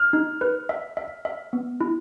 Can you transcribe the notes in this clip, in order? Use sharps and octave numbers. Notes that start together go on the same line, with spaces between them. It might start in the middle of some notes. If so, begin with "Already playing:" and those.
Already playing: F6
D#4
B4
E5
E5
E5
B3
E4